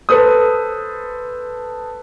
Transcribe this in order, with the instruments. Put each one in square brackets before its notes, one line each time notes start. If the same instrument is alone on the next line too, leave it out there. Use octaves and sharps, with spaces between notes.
[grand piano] A4 B4 C5 D#6